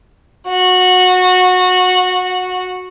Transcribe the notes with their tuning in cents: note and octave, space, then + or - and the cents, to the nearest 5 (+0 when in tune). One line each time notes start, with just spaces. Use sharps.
F#4 -15